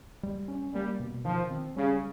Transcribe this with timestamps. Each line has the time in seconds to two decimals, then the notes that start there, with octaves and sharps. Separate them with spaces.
0.23 G3
0.48 C#4
0.74 G3 A#3
1.00 B2
1.25 D#3 F3
1.50 C4
1.76 C#3 G3